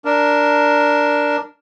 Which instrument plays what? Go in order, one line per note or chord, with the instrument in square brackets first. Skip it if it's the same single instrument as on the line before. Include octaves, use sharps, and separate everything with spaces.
[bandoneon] D4 A#4